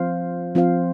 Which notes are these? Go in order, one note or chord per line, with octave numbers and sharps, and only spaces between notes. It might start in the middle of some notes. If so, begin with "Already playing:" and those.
Already playing: F3 C4 F4 C5 F5
F3 C4 F4 C5 F5